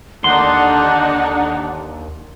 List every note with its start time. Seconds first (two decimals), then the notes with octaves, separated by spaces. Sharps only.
0.24 D#2 D3 D4 D#4 F#5 C6